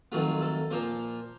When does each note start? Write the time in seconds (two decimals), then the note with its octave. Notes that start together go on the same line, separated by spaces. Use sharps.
0.12 F2 D#3 F#3 A3 F4
0.41 A4
0.71 A#2 F3 A#3 C5